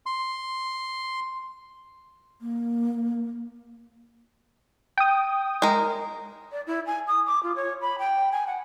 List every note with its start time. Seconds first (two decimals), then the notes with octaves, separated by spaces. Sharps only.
0.06 C6
2.41 A#3
4.98 G5 D#6
5.62 G#3 A#4
6.52 D5
6.67 E4
6.86 G#5
7.07 D#6
7.27 D6
7.43 F4
7.56 C#5
7.81 B5
7.99 G5
8.32 G#5
8.47 F#5